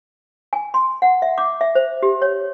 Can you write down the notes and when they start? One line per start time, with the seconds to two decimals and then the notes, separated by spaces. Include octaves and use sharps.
0.53 G#5
0.74 C6
1.02 F#5
1.22 E5
1.38 D6
1.61 E5
1.75 C5
2.03 G4
2.22 C#5